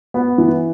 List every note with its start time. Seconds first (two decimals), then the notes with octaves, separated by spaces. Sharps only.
0.14 B3
0.38 E3